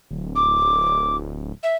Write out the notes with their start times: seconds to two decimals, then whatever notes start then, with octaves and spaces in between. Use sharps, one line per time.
0.11 D1
0.36 D6
1.63 E5